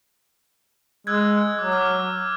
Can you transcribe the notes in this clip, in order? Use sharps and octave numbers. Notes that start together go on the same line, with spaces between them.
G#3 E6 F#6 G#6
F#3 D6
D6 F6